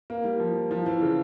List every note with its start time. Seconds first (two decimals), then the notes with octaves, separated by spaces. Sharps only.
0.10 A#3
0.24 G3
0.40 F3
0.71 F3
0.86 E3
1.01 C#3